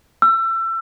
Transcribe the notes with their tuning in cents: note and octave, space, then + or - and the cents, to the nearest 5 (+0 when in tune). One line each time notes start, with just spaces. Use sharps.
E6 +30